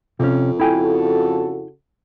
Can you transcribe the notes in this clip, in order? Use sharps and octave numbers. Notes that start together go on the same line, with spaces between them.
F2 C3 C#4
C#3 E4 F#4 A4 G5 G#5